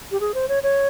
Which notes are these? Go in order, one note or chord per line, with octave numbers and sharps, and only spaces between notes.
G4
G#4
C5
C#5
C#5